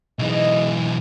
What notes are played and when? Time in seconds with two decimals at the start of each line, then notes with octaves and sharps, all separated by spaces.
0.19 B1 G#2 B2 E3 D#5